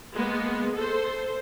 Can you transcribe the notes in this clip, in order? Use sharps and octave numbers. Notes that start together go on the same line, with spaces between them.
G#3 A#3 B3
A4 C5